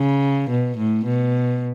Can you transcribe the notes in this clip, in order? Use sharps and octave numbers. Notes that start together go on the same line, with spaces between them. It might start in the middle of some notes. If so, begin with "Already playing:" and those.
Already playing: C#3
B2
A2
B2